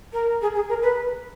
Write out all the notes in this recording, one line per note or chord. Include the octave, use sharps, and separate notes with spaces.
A#4
G#4
G#4
A#4
B4